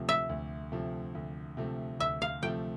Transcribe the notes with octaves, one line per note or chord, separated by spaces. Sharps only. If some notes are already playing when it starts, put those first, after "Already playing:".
Already playing: D2 C3 F3 A3
E5
D2
C3 F3 A3
D2
C3 F3 A3
D2 E5
F5
C3 F3 A3 G5